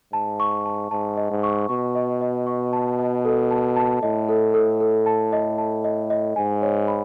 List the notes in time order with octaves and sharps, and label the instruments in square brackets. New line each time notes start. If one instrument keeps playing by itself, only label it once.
[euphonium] G#2 [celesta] A5
[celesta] C#6
A5
[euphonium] G#2 [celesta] A5
[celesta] D#5
[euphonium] G#2
[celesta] C#6
[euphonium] B2 [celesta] C#6
[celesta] D#5
D#5
C#6
A5
D#5
A4
A5
A5
[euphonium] A2 [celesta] D#5
[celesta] A4
A4
A4
A5
D#5
A5
D#5
D#5
[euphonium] G#2 [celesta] G#5
[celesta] C#5
B5